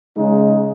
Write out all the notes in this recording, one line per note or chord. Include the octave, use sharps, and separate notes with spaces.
C#3 G#3 D#4